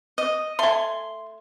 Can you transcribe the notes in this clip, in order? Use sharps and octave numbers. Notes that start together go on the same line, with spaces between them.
D#5
A3 G#5 C6